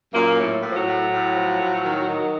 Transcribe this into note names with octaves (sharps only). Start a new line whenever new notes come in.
F#2 A#2 A#3
A2
A2
F3
F#3
A2
A2
F3
A2
D#3
D#3